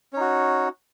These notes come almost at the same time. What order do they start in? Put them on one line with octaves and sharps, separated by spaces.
C#4 D#4 F#4